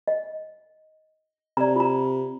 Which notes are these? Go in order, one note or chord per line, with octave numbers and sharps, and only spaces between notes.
D#5
C3 D5 A#5
F4 A#5